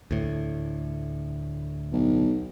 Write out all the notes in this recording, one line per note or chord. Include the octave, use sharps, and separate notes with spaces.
D2 A2
B1